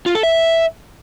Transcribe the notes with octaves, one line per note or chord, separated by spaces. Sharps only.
F4
A4
E5